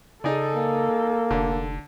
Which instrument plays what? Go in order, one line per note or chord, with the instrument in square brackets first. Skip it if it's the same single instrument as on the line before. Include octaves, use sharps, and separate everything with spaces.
[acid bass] C#3 [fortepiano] D#4 G#4 D5 [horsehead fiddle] A4
[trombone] A#3
[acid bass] F1 [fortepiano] D3